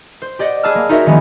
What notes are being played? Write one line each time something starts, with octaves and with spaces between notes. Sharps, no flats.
C5
G4 D5 D#5 F#5
G#4 B4 A5 E6 F6
A#3
D#4 F4 F#4 A#4 C#5 E5
D#3 F3 G#3 A#3 B3 C#4